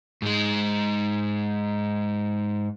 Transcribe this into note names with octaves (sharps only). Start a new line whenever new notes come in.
G#2 G#3